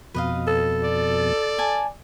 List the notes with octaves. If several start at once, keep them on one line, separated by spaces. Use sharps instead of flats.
F2 B2 B4 D#5 F5
A4
D5
G#5 A5